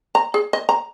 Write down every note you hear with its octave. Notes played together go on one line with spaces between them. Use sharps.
A#5
G#4
D#5
A#5